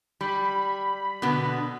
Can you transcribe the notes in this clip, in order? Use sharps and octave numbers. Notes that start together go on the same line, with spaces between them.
G3 B5
B2 D3 B3